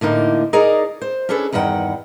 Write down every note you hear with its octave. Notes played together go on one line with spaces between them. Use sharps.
A2 D3 A#3 D#4
D#4 G#4 A#4 D5 D#5
C5
C#4 D4 G#4 A4 B4
E2 G2 D#3 D#5 F#5 G5